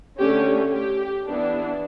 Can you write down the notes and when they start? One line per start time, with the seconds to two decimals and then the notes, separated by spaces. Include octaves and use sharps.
0.19 D3 A3 C#4 G4
0.72 G4
1.25 E3 B3 D4